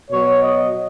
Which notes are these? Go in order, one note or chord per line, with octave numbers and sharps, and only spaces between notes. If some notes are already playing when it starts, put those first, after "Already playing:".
B2 F#3 C#5
D#5